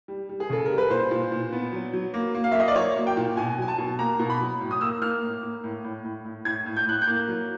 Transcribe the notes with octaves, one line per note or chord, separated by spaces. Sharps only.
G3
G3
G#4
C#3 A4
G3 A#4
B4
A#2 C5
A#2
A#2
B3
F#3
F#3
A#3
A#3
F5
E5
A#3 D#5
D5
F#3 C#5
A#3
G5
A#2
B2 G#5
F#3 G#5
A5
B2
A#3 A#5
B2
B5
F#3
A2
D#6
A#3 E6
A#3 F6
A2
A#3
A2
A2
A2
A2
A2 G#6
A2
G6
A2 F#6
G6
A#3
F#3